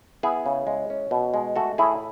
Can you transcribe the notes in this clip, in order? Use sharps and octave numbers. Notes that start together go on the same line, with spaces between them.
B3 E4 G#4
C#3
G#3
C#4
B2
G#3
A3 F#4 A4
A2 E4 G#4